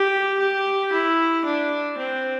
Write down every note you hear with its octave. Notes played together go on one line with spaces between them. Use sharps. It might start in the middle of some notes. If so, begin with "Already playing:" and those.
Already playing: G4
G4
E4
D4
C4